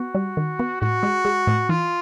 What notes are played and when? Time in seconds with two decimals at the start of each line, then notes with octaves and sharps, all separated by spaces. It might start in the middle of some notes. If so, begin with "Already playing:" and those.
Already playing: B3 F#4
0.15 G3
0.37 D#3
0.60 B3
0.81 A2 F#4
1.03 G#3
1.25 G#3
1.47 A2
1.69 E3 F4